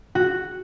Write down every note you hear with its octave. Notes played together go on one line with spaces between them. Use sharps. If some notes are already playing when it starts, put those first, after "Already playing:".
F#4